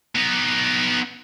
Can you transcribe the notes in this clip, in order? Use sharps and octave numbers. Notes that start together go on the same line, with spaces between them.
B3 D#4